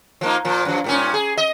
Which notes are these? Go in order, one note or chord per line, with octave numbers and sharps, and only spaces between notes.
F3 A#3 D#4
A#2 F3
F#2 F3
G2 A#2 C#4
G#4
D#5